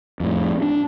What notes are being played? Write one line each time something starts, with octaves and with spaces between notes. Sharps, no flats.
F2 A2
D4